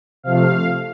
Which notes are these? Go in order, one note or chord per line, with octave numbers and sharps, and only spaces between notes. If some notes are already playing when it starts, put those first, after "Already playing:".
C3 F3 A3 F5